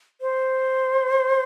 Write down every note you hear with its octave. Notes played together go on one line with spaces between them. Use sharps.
C5